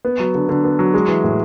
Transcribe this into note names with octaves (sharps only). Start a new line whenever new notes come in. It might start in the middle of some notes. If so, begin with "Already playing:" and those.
B3
F#3
D3
D3
B3
F#3
G#3
E3
A2